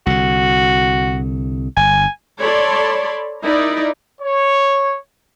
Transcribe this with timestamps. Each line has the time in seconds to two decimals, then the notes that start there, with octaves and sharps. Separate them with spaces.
0.06 C2 D3 F#4
1.77 G1 G#5
2.39 A4 C#5 D5 A5 B5 C6
3.42 D#4 E4 A#4 D5
4.21 C#5